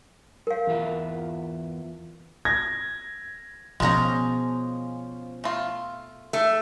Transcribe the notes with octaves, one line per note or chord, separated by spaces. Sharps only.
A#4 F5
E2 F4 E5
G#6 A#6
B2 F3 G#3 B3 C#4 A#4 A#5
A3 F4
A3